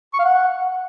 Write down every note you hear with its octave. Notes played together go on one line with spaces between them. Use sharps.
C#6
F5
F#5